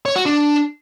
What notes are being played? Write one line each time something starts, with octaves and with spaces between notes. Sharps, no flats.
C#5
F#4
D4